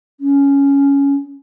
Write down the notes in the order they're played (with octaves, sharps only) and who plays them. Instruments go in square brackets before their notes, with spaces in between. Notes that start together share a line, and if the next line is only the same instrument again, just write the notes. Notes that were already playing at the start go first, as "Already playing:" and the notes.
[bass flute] C#4